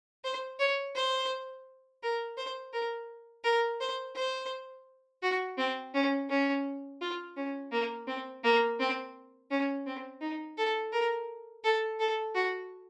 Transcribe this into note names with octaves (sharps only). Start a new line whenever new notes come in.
C5
C#5
C5
A#4
C5
A#4
A#4
C5
C5
F#4
C4
C#4
C#4
F4
C#4
A#3
C4
A#3
C4
C#4
C4
D#4
A4
A#4
A4
A4
F#4